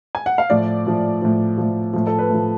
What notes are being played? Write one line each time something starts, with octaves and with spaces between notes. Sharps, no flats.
G#5
F#5
F5
A2 F3 D5
A2 F3
A2 F3
A2 F3
A2 F3
A4
B4
A2 F3